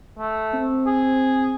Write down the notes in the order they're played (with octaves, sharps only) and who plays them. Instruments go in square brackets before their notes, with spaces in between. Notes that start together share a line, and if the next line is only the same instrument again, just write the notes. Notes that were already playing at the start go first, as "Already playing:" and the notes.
[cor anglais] A3
[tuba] C4
[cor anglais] G#4